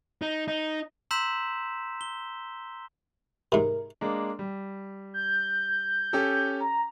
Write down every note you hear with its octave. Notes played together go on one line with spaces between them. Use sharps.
D#4
D#4
A#5 C6 E6 G6 B6 E7
G7
G#2 C3 A#4
G#3 A#3 D4
G3
G6
C#4 G4 A4
A#5